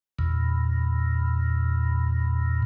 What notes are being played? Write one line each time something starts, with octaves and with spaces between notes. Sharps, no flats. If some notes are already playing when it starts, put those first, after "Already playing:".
E2 A#2